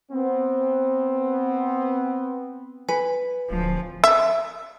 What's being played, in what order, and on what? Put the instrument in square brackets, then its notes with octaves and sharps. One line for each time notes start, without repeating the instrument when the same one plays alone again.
[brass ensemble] B3 C4
[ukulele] B4 [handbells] G#5
[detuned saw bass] D1 [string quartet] F3
[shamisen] E5